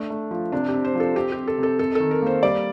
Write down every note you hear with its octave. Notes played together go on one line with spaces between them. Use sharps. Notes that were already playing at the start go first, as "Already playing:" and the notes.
Already playing: A3 D4
A3
F3
C3 D4
C4 G4
C5
F3 A4
C4 G4
C4 G4
A4
C3 A4
C3 A4
D#3 A4
A#4
A#3 C5
G3 D5